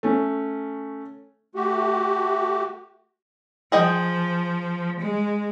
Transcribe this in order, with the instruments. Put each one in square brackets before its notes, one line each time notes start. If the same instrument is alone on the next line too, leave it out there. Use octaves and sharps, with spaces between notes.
[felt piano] A3 C#4
[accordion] A3 F#4 G4
[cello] F3 [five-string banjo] G#4 D#5 G5
[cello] G#3